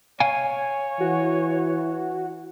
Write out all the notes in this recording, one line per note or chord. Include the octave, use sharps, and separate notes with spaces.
C#5 F5 G#5
E3 F#4